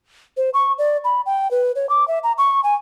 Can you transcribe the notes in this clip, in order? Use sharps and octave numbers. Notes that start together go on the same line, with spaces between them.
C5
C#6
D5
B5
G5
B4
C#5
D6
E5
A#5
C#6
G#5